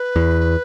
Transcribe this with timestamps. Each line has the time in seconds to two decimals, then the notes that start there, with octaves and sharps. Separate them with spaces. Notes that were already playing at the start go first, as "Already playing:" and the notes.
Already playing: B4
0.16 E2